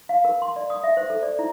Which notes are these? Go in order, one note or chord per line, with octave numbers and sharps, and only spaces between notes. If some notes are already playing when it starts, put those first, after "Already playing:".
F5
A#4
C6
D5
D#6
E5
C5
A4
D5
E4